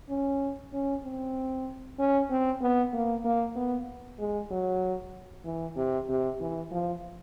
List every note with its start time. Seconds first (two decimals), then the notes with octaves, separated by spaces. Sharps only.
0.09 C#4
0.73 C#4
1.03 C4
1.99 C#4
2.30 C4
2.61 B3
2.93 A#3
3.25 A#3
3.56 B3
4.19 G#3
4.51 F#3
5.45 E3
5.76 C3
6.09 C3
6.40 E3
6.71 F3